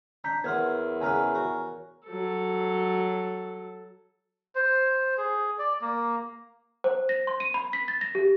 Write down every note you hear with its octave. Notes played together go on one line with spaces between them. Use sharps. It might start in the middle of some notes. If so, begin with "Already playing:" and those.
D4 A#5 G6 B6
E2 B3 A#4 C#5 F#5 C6 F6 G#6
C#3 B3 B4 G#5 A#5 F6
F#4
F#3 A4
C5
G#4
D5
A#3
C5
A#6
C6
D#7
B5
B6
A6
A#6
G4